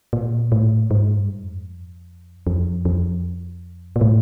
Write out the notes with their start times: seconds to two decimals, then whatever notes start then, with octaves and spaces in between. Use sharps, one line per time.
0.13 A#2
0.52 A2
0.91 G#2
1.17 G2
1.43 F2
2.47 F2
2.85 F2
3.96 A#2
4.01 A2